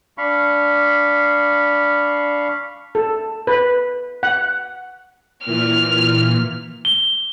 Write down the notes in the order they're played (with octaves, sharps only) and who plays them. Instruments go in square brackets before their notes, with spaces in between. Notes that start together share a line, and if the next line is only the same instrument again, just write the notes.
[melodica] D4 F5 B5 C#6
[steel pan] A4
B4
F#5
[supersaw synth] A#2 E3 [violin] F6
[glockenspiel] G7